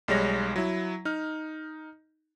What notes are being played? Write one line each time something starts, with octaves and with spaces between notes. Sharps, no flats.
B1 G3 G#3 C#5 A#6
F#3 E4
D#4 F6